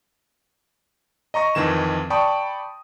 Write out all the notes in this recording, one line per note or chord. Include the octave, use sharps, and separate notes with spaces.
D#5 A#5 C#6 A#6
F2 D#3 E3 E7
D5 G5 A5 B5 C#6 D#6